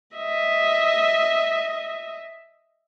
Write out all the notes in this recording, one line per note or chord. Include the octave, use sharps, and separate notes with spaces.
D#5 E5